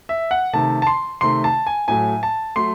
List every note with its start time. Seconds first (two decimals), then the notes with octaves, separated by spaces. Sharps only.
0.09 E5
0.31 F#5
0.53 C3 D#3 A3 A5
0.82 A5
0.87 C6
1.21 C3 D#3 A3 C6
1.44 A5
1.67 G#5
1.88 A2 F#3 A3 G#5
2.23 A5
2.56 F#3 A3 C6